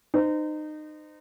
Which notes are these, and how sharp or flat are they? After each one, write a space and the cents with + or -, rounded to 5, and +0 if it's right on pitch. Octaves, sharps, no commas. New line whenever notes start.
D#4 -25 C5 -30